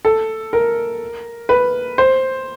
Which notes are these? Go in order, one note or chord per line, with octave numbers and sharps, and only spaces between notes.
A4
A#4
B4
C5